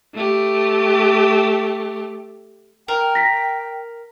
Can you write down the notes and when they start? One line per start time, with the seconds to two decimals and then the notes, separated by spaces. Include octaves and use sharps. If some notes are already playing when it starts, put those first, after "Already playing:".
0.14 A3 G4
2.88 A#4 G5
3.15 A#6 B6